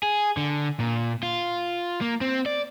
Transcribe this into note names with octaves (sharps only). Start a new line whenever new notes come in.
G#4
D3
A#2
F4
A#3
C4
D5